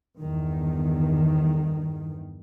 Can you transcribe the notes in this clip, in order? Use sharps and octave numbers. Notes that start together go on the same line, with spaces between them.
G1 E2 D#3